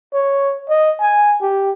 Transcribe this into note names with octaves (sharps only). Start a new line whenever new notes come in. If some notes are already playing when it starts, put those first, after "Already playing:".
C#5
D#5
G#5
G4